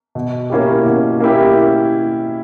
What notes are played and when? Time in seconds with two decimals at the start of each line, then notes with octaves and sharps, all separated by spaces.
0.15 B2
0.50 A#3 C#4 E4 G4
0.85 B2
1.20 A#3 C#4 E4 G4